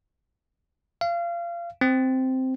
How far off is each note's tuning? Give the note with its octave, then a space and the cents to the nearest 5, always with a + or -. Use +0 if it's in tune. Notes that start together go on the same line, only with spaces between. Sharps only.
F5 -30
C4 -5